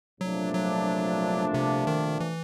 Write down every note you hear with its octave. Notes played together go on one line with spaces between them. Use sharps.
C2 A#2 F3 F#3 A3 D4
F#3
C3
D#3
E3